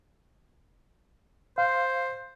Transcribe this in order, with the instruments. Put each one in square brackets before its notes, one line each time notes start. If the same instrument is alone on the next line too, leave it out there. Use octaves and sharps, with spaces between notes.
[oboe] C5 [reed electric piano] F5